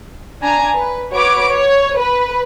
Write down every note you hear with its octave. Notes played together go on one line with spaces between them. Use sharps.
D4 G#5 A#5
B4
F#4 B4 C#5 D6
C#5
B4